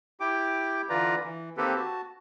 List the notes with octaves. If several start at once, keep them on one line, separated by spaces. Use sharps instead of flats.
E4 G4 G5 D6
D3 E3 F4 B4 D5 A#5
E3
D#3 A#3 C4 G4 A4 B4
F#4 A5